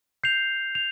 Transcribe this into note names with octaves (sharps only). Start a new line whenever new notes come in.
G6 C7 F7
F7